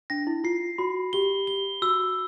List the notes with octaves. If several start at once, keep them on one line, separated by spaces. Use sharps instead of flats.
D4 A#6
E4
F4 C7
F#4 B5
G4 G7
G7
F#4 E6